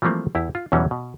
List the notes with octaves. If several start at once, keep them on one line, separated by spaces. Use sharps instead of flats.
E3 F3 G3 A3 A#3 C4
E2 E4 G4
F4
E2 B2 E3 F#3 G3 C#4
B2